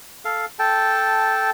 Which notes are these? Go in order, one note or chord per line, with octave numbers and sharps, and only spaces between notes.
A4 F5
A4 G5 A5